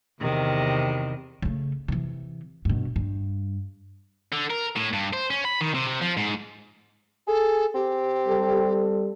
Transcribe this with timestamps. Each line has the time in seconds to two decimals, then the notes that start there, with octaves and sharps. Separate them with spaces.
0.20 E2 C3 D#3
1.42 C#3 A3
1.88 C3 E3
2.65 G2 B2
2.96 G2
4.32 D3
4.50 A#4
4.76 A2
4.93 G2
5.13 C5
5.31 C#4
5.45 B5
5.61 D#3
5.74 C3
5.87 C3
6.01 F3
6.17 G#2
7.27 G#4 A4
7.74 C4 G4
8.27 G3 A4